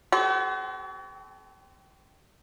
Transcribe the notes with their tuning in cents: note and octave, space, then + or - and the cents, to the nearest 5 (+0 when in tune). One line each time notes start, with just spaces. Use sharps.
C4 -20 F#4 +40 A4 -45